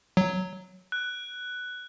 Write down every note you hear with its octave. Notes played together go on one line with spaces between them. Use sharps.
F#3
F#6